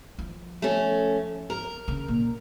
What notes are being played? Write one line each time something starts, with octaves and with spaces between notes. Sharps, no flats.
F3
A3 C#4
A#4
C#3
A#2